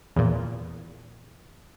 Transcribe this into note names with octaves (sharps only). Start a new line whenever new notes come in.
E2 A#2